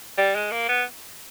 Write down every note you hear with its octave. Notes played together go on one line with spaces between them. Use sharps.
G3
G#3
A#3
B3